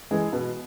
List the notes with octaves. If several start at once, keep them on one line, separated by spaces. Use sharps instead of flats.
E3 G#3
B2